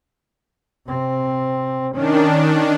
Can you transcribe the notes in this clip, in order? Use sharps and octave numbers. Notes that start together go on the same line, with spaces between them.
C3 C4
D#3 C#4 D4